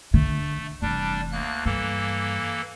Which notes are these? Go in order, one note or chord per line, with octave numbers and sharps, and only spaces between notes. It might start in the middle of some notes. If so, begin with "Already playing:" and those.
D3 A3
F1 E3 G3 D4
D2 A#3 F#6
G2 E3 A#3 A4